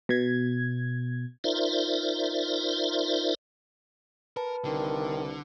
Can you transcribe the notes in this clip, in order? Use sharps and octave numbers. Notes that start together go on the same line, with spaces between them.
B2 G#6
D#4 F4 A#4 C5 D5 E5
A#4 B4 A5
C2 D3 D#3